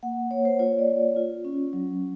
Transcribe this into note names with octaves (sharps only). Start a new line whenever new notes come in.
A#3 F#5
A#3 C#5
C5
F4 C#5
D5
F4
F4
C#4
F#3